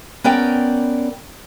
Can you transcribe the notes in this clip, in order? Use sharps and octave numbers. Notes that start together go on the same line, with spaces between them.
B3 C#4 A#4 D5 G5